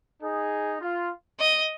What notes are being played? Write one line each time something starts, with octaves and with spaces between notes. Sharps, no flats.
D#4 G#4
F4
D#5